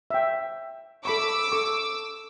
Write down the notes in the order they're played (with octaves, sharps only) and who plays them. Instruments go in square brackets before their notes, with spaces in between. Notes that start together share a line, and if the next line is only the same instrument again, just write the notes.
[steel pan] E5 G5
[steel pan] A4 B5 C#6 [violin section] D6 E6
[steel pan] A4 C#6